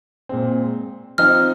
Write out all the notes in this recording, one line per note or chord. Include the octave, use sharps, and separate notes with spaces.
A#2 G#3 C4
F3 C4 D#4 F6